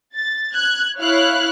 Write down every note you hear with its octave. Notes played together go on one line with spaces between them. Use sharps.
A6
F#6 G#6
E4 C#5 F5 F6 F#6